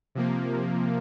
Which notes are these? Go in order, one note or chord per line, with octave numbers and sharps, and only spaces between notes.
C3 F3 A#3